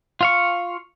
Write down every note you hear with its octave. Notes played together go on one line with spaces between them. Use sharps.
F4 F5 C#6